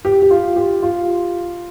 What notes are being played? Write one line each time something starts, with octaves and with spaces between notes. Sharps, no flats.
G4
G4
F4
G4
F4